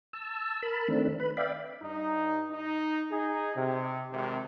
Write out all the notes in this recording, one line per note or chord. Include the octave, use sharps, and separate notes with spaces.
A5 E6
A#4 A5 B5
D#3 A3 C4 D4
B4 B5
D5 E5 F5 G5 B5
G2 D#4
D#4
D#4 G#4
C3
G#1 C3